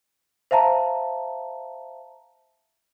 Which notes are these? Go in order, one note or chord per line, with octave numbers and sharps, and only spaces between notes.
C5 E5 F5 A5 A#5